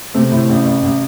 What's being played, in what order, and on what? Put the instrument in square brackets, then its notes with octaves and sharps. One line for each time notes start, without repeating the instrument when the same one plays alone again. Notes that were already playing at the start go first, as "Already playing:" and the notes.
[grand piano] C3 C4 [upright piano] A3
[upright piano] A2
A1
A1
A1